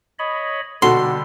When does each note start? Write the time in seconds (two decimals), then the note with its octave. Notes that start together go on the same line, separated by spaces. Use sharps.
0.19 C#5 D#5 B5
0.82 B2 D3 G3 F#4 A4 C6